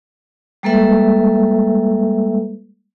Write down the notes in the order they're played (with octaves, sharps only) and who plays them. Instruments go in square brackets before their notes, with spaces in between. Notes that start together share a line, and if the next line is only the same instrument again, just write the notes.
[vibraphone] G3 G#3 A#3 A4 B4 E5